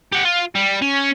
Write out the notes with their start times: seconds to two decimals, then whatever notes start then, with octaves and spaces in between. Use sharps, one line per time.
0.12 G4 F#5
0.25 F4
0.55 G3
0.82 C#4